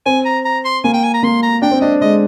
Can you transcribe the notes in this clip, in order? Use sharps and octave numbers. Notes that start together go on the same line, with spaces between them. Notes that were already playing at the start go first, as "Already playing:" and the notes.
C4 G#5
A#5
A#5
C6
A#3 G#5
G5
G#5
A#5
A#3 C6
A#5
D4 G5
C4
D4 D#5
G#3 D#5